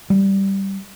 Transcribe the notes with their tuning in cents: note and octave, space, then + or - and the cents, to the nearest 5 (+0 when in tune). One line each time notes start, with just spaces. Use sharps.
G3 -5